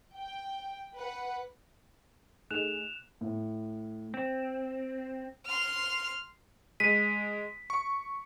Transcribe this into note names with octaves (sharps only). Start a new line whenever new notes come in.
G5
B4 F#5
A3 D#4 G#4 F#6 E7 F7
A2
C4
C6 F6
G#3 B6 D#7
C#6